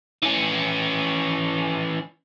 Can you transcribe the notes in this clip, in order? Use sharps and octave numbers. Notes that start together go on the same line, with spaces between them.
E3 C#4